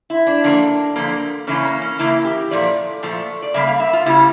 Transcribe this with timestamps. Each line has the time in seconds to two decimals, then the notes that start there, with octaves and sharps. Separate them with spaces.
0.10 E4
0.27 D4
0.44 D3 F3 A#3 D4
0.96 D3 F3 A#3
1.47 C#3 E3 A#3 C#4
1.65 A#3
1.82 C#4
1.99 C#3 E3 A#3 E4
2.25 G4
2.51 A#2 F3 A3 D5
3.03 A#2 F3 A3
3.42 D5
3.54 C#3 G3 A#3 E5
3.68 F5
3.80 E5
3.93 F4
4.06 C#3 G3 A#3 E4